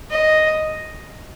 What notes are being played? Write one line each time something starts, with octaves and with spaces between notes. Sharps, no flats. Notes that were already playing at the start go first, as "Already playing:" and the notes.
D#5